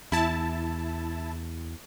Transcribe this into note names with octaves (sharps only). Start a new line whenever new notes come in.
E2 E4 A5